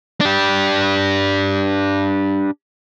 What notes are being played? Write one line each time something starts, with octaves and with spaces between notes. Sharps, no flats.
D4 G4